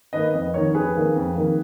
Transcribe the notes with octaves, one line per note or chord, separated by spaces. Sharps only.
D#3 A#3 B4 D#5
F2 B4 D#5
D#3 A#3 A#4 C#5
F2 G#4 B4
D#3 A#3
F2
D#3 A#3